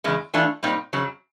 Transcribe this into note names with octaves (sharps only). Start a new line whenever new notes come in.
E2 C#3 G#3
E3 A3 D4 F4
A#2 G3 C4 D#4
F2 C#3 F#3